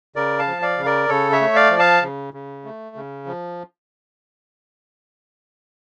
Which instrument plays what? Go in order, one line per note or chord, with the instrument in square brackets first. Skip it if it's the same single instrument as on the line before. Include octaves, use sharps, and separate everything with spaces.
[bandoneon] C#3 A#4 D5
F5 A5
F3
D5 F5
C#3
A#4 D5
C#3 A4 C#5
C#5 E5
A3
D5 F5
F3
F5 A5
C#3
C#3
A3
C#3
F3